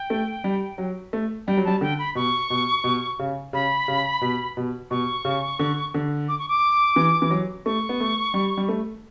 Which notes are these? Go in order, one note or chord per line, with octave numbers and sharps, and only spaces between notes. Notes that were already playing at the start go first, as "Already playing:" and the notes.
Already playing: G5
A3
G3
F#3
A3
G3 G5
F#3
G3 A5
D3 G5
B5
B2 C#6
B2
B2
C#3
C#3 B5
C#3
B2
B2
B2 C#6
C#3
D3
D3
D6
C#6
D6
E3
E3
F#3
A3 C#6
B3
A3
G3
G3
A3